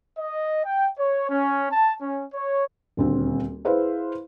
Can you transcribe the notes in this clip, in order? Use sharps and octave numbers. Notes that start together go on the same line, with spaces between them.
D#5
G5
C#5
C#4
A5
C#4
C#5
D#1 D2 C4
E4 G#4 B4 C5 F5